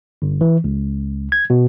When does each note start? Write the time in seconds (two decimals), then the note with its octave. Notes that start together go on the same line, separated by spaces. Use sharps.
0.22 G1
0.41 E3
0.64 C#2
1.32 G#6
1.50 B2